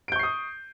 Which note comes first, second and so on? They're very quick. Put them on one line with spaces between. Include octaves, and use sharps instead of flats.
D7 G6 C#6 C7 D#6